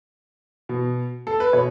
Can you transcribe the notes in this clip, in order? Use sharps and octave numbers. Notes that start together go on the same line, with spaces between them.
B2
A4
B4
B2 C#5